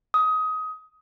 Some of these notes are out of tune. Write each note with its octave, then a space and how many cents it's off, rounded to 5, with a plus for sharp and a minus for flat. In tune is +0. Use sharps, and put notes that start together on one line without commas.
D#6 +20